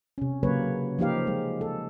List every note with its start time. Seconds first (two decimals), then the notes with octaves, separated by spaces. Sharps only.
0.18 C3 C#4
0.43 C#3 F#3 A#3 B4 C#5
0.99 F3 A#3 D#4 G4 F5
1.27 G#3
1.61 A4